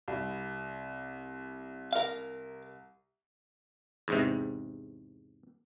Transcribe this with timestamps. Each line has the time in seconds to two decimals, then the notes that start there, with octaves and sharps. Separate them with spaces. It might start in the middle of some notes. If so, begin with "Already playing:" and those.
0.08 C2
1.93 A#4 F5
4.08 E2 G#2 C3